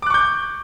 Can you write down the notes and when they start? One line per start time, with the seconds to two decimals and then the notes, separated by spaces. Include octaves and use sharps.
0.02 D6
0.06 F#6
0.10 C#6
0.14 G6